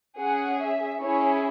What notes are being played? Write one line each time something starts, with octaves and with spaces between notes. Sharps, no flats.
C#4 G#4 F#5
E5
C#4 E4 G#4 C#5